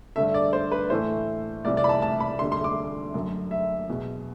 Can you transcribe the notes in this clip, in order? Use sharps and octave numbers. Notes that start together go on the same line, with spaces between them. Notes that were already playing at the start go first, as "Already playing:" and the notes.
G2 D3 A3 E5
D5
C5
B4
A2 E3 A3 C5
C2 C3 E3 D5
D5
B5
A5
A5
B5
D2 D3 G3 C6
C6
D6
F#2 D3 F#3 A3
E5
E2 B2 F#3